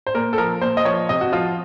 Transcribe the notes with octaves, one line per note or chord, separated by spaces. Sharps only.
C5
A#2 A#4
A4
F3 A#4
A#2 C5
D#5
F3 C#5
C3 D#5
F#4
F3 F4